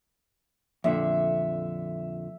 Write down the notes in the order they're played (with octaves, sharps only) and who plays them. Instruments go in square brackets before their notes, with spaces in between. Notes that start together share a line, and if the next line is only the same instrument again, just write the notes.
[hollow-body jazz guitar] F2 A#2 D3 [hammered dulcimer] E5